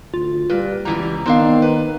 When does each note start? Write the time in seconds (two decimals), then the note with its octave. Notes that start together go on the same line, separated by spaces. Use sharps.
0.14 D2 F4
0.50 A#2 G3 B4
0.85 C#2 B2 E3 G3 A#5
1.26 D#3 B3 C4 D4 F5
1.62 B4